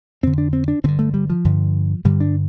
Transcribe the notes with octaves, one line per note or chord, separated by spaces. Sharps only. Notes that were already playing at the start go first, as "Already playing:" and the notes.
F2 D3 C4
D4
C4
D4
G2 D3 C4
A3
G3
F3
G2 D3
G2 D3 G3
D4